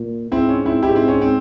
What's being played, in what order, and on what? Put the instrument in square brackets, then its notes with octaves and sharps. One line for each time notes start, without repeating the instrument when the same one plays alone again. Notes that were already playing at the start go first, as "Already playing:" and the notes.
Already playing: [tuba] A#2
[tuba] G#2 [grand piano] C4 E4
[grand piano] C#4
C4 E4
[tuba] G#2 [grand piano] E4 G4
[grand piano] C4 E4
C#4
C4